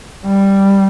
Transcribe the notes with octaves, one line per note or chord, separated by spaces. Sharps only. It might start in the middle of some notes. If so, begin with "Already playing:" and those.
G3